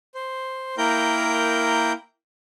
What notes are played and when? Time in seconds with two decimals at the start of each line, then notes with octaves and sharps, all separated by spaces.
0.15 C5
0.78 A#3 E4 A#4 G5 A#5 G6